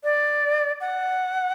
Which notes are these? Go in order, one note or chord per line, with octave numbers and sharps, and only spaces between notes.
D5
F#5